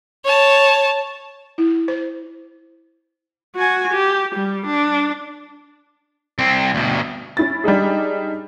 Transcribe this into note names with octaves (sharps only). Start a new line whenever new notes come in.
C#5 A5
E4
C5
F#4 G#5
G4
G3
D4
C2 C4
D2 B2
C#4 E4 A6
G3 D4 D#4 G#4